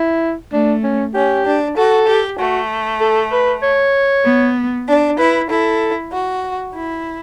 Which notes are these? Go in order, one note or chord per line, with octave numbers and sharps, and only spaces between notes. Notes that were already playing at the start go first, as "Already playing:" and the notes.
Already playing: E4
A3 D4
C#4
C#4 G4
D4
F#4 A4
G4
A3 F#4
A4
B4
C#5
B3
D4
E4 B4
E4 A4
F#4
E4